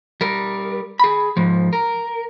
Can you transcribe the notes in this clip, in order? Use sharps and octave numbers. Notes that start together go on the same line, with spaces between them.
G3 A#4
G#4 B5
G#2 F3
A#4